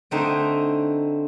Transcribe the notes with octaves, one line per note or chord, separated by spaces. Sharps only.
D3 A3 C4 D#4